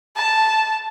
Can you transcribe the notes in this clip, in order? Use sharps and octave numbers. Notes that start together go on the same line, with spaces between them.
A5